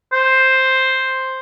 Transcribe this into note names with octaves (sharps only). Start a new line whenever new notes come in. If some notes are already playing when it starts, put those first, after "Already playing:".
C5